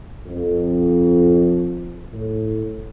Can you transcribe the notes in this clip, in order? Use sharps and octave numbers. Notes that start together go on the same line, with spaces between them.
F2
A2